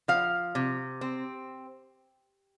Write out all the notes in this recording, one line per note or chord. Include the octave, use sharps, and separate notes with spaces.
F3 F5
C3
C4